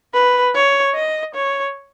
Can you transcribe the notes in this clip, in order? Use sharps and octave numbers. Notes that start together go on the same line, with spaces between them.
B4
C#5
D#5
C#5